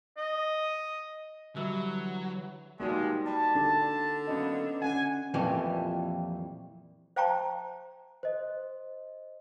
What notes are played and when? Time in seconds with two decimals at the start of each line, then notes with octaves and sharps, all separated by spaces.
0.17 D#5
1.56 D3 E3 F#3 G3
2.80 B2 F3 G3 G#3 A#3 D#4 F#4
3.26 G3 A5
3.55 D3 D4
4.28 F#3 A#3 B3 C#4 D#5
4.82 C#4 F#5 G#5
5.34 F2 A#2 E3 F3 G3 A3
7.16 C5 F5 G5 A5 A#5 C#6
8.23 C5 D#5